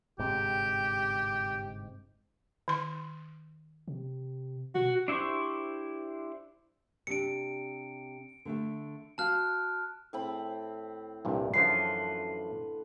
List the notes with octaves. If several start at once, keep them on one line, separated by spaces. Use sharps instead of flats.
G1 G#2 C3 G4
D#3 C6
C3
B2 F#4
D4 E4 G4 C5 C#6
C3 D4 C#7 D7
D3 A3 E5
F#4 F5 A5 F6 F#6
A2 C4 B5
C2 G2 A#2
F#2 D3 E3 F3 B4 C6 C7